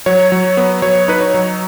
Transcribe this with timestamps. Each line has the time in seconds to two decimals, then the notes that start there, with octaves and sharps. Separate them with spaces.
0.06 F#3 C#5
0.32 F#3
0.57 B3
0.82 F#3 C#5
1.08 D#4 B4
1.21 C#5
1.34 F#3